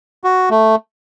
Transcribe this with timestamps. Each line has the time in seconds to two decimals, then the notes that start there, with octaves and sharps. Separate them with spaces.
0.24 F#4
0.50 A3